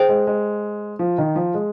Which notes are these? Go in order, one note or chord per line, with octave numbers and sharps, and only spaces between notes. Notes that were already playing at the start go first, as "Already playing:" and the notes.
Already playing: G#4 C5 G5
G#3
G#3
F3
D#3
F3
G#3